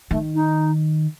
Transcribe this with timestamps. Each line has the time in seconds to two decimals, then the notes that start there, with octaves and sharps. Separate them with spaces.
0.11 D#3 A3
0.34 D#4